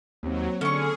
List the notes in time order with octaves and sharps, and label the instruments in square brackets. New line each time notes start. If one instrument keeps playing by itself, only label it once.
[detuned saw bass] D#2 [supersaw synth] F#3 [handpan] A#3 C4
[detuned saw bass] D3 [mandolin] C#4 C#6 [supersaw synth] G#4